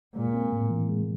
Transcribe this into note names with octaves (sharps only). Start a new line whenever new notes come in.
A#2 G#3
C4
A2
E3
G#3